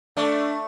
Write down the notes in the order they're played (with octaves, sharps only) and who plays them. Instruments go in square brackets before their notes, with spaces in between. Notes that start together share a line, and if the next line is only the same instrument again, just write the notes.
[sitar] A3 [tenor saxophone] D4